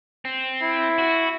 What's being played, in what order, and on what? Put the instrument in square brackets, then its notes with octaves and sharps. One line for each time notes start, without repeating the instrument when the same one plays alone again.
[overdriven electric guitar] C4
[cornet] E4
[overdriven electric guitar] F#4